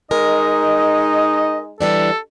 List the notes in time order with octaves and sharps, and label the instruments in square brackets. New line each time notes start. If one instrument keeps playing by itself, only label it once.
[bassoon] G#3 [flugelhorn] D#4 [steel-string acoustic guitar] A#4 [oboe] D#5
[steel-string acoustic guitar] E3 G3 D4 [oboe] A4